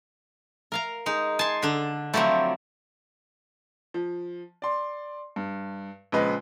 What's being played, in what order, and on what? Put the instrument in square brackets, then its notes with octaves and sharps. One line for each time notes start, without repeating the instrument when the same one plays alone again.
[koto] A#4 F5 A#5
[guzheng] G#3 D#4
[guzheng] G#5 C6 [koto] A5
[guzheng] D3 D4
[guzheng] F3 F#3 C4 [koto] A3 E4 G4
[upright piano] F3
D5 C6
G2
A#1 C#3 G#3 B4 D#5